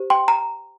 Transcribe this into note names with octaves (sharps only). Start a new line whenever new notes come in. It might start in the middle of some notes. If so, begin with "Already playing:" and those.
Already playing: G4 C5
G5 C6
A#5